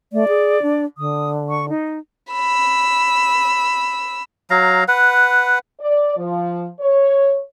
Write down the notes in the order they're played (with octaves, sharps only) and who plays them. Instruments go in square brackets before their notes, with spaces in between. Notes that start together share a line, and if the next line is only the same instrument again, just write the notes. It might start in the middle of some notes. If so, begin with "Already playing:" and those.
[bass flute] A3 [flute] D5
[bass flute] G#4
D4
[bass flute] D3 [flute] D#6
[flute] C#6
D#4
[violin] B5 E6
[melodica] F#3 F5 A#5
B4 F#5
[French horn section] D5
F3
C#5